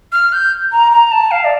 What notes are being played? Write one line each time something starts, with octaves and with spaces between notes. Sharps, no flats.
F6
G6
A#5
A#5
A5
F5
D5